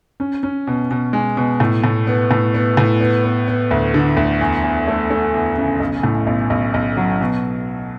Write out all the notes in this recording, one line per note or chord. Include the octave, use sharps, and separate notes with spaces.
C#4
C#4
B2
B2
G#3
B2
A2
A2
B3
A2
B3
A2
B3
B3
B3
D2
D3
D2
E2
E2
A3
A3
E2
C#3
B1
A2
B1
B1
B1
F#3
B2